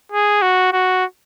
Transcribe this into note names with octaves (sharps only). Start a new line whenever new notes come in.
G#4
F#4
F#4